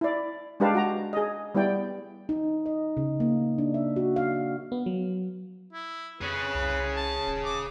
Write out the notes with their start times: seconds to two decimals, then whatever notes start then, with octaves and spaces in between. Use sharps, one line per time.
0.01 E4 D5
0.60 G#3 D4 G4 B4 F5 A5
0.75 F#4 A#5
1.13 G#4 D#5
1.55 G3 B3 E4 D5 G5
2.29 D#4
2.66 D#5
2.97 C#3
3.20 A#3
3.58 D4
3.74 E5
3.96 F#4
4.16 F5
4.72 B3
4.86 F#3
5.73 E4
6.21 F2 G#4 B4 C#5
6.54 C2
6.97 A5
7.27 D#1
7.45 D6